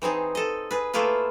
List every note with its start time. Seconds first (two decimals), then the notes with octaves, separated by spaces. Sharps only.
0.02 E3 C4 D#4 G#4
0.35 A4 D#5
0.71 G#4 B4
0.93 A3 A#3 E4 F4 G#4 B4